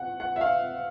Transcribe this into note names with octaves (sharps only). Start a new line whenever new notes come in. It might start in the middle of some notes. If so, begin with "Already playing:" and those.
Already playing: F#5
F#5
E5
F5